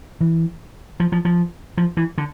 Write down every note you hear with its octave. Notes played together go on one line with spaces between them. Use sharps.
E3
F3
F3
F3
F3
E3
D3